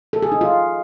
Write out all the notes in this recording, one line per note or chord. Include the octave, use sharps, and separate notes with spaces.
A4
G#4
D#4
F4